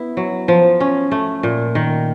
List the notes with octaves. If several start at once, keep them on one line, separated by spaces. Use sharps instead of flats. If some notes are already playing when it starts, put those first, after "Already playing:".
Already playing: B3 E4
F#3
F3
C#4
A3
A#2
D#3